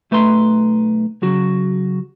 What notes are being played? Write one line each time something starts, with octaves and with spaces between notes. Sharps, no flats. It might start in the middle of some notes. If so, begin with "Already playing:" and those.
B1 A3 B4 A#5 C6
C#3 F#3 F#4